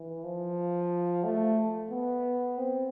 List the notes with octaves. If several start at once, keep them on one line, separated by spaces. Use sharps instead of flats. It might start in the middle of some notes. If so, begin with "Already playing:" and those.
Already playing: E3
F3
A3
B3
C4